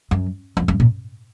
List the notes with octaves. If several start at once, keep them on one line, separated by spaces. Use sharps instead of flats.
F#2
F2
F#2
A#2